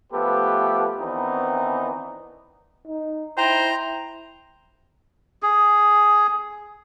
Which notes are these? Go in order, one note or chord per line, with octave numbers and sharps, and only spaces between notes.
F3 A3 B3 G4 A4 B4
D#3 E3 B3 C4 D4 D#4
D#4
E4 C5 G5 A#5
G#4